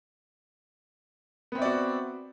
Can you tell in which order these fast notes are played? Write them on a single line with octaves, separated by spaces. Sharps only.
B3 C4 E5 D5 F#4